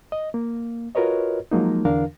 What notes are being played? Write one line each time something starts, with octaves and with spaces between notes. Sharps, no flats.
D#5
A#3
F4 F#4 A#4 B4 C#5 D#5
F3 F#3 G#3 A#3 D#4
E2 D3 E3 D4 A#4 F5